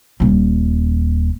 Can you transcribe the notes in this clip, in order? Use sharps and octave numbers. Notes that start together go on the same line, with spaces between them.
D#1 G3